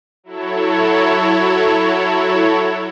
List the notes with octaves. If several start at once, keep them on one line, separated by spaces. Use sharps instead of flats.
F#3 E4 A4 C#5